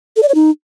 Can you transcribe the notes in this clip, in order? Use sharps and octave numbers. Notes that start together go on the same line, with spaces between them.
A4
D5
C#5
D#4